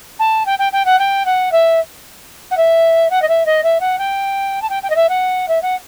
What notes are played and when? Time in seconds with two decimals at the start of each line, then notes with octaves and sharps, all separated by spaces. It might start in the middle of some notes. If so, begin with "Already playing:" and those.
0.19 A5
0.46 G5
0.59 G5
0.73 G5
0.85 F#5
0.99 G5
1.26 F#5
1.52 E5
2.51 F#5
2.57 E5
3.10 F#5
3.22 D#5
3.29 E5
3.46 D#5
3.63 E5
3.80 F#5
3.99 G5
4.62 A5
4.70 G5
4.83 G5
4.90 D#5
4.96 E5
5.09 F#5
5.48 E5
5.62 F#5